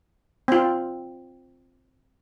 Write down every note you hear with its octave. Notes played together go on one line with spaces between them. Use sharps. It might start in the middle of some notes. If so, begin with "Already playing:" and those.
C4 F4